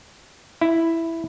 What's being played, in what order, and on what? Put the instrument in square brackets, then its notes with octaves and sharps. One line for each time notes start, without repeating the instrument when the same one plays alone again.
[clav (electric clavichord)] E4